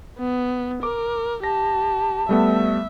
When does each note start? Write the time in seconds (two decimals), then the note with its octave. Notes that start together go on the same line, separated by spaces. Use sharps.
0.19 B3
0.83 A#4 D6
1.44 G4 A5 A#6
2.29 G3 A3 B3 E5